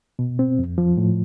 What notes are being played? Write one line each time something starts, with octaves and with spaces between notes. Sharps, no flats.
B2
C4
F2
F3
A2